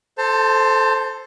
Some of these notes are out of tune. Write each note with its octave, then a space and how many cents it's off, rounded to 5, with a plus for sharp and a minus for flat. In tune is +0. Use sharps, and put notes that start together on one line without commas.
A4 -10 C5 +0 A5 +30